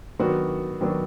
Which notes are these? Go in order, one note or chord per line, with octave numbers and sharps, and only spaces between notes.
D#3 F#3 B3 D4 F#4
D#3 F#3 B3 D4 F#4